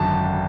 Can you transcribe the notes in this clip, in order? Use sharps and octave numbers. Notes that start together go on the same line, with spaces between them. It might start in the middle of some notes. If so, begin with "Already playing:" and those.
Already playing: G#1 F#2 D3 A5